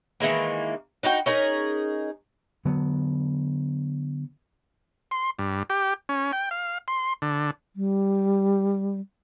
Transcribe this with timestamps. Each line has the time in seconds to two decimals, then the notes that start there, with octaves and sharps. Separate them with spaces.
0.20 D#3 E3 G#3 A#3
1.03 D4 D#4 F#4 G5
1.26 C#4 D#4 G#4 A#4
2.65 D3 F#3 B3
5.11 C6
5.39 G2
5.70 G4
6.09 C#4
6.33 G5
6.51 F5
6.88 C6
7.22 D3
7.76 G3